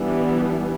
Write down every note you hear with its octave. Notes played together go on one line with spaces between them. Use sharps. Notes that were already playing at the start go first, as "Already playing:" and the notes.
Already playing: E3 G3 B3 D4